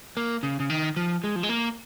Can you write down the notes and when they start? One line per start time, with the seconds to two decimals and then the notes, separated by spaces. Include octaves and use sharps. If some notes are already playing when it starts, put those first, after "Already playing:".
0.17 A#3
0.43 C#3
0.60 C#3
0.70 D#3
0.97 F3
1.24 G#3
1.36 F3
1.43 G#3
1.49 A#3